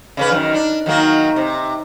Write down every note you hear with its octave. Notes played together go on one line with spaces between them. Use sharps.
C#3 C#4 B4
F#2 D#3
D4
D#3 F#3 A#3
C3